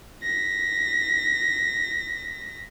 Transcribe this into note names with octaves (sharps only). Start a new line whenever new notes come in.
A#6 B6